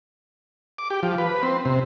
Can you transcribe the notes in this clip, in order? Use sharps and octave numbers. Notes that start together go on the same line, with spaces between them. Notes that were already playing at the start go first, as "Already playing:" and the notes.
D6
G4
F3
B4
C4
C3